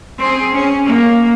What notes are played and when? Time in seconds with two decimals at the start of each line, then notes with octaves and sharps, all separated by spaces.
0.18 C4 G#4
0.53 C#4
0.86 A#3